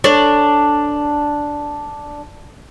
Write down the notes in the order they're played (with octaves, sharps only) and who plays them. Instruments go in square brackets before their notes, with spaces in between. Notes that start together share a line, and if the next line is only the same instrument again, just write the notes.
[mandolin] D4 [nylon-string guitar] A4 C#5